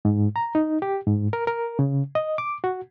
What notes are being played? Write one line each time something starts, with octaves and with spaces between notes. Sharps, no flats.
G#2
A#5
D#4
G4
G#2
A#4
A#4
C#3
D#5
D6
F#4